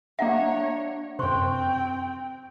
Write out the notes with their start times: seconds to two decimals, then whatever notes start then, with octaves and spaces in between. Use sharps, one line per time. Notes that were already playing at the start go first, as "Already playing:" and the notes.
0.19 A#3 D4 C#5 D#5 E5 F#5 A#5
1.19 F#2 C3 C4 C5 G5 C6 C#6